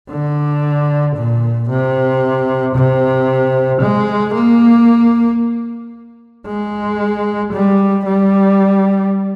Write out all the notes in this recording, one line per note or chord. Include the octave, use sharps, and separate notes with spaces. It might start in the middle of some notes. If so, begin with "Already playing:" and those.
D3
A#2
C3
C3
G#3
A#3
G#3
G3
G3